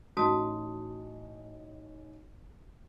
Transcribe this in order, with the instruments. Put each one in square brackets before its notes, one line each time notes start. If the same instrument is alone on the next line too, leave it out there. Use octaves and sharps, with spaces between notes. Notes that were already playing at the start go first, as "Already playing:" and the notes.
[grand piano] A1 D#4 [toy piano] F#4 A5 D#6